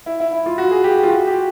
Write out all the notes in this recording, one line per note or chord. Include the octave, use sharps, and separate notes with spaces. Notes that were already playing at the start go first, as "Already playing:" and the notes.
E4
E4
E4
F4
F#4
G#4
G4
F4
F#4
G4